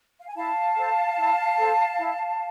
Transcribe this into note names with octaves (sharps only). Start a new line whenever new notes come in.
F5
G#5
E4 F5 A5
A4 C5
E4
A4 C5
E4